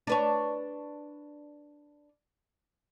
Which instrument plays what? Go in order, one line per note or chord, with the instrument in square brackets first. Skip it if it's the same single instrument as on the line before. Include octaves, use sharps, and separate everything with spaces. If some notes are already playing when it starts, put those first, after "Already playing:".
[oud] D4 B4 C#5